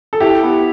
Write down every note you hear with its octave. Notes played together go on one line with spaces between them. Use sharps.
A4
E4 G4
B3